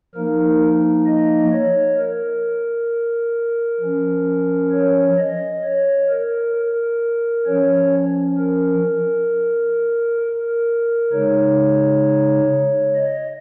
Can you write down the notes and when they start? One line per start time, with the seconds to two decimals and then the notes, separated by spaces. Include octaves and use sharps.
0.15 F3 A#3 D#4 A#4
1.06 D#5
1.52 C#5
1.97 A#4
3.80 F3 C#4
4.72 C#5
5.18 D#5
5.64 C#5
6.09 A#4
6.55 A#4
7.46 F3 C#4 C#5
8.38 A#4
10.21 A#4
11.12 C#3 G#3 D#4 C#5
12.95 D#5